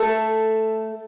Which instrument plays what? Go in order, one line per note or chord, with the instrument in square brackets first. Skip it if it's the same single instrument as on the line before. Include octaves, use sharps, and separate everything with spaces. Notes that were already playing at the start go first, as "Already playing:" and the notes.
Already playing: [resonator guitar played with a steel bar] A3 A4